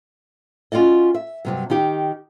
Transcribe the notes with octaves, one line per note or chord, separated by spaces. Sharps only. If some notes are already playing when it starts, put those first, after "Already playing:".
C#4 F4 F#4 D5 D#5
E5
G2 C3 F#3
D#3 D#4 G4